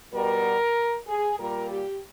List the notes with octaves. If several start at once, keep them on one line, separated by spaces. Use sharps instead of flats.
B2 G3 A#4
G#4
A#2 G3 A#4
G4